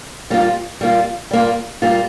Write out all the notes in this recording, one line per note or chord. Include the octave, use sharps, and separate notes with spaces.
G3 A#3 F4
G3 A#3 F4
G3 A#3 F4
G3 A#3 F4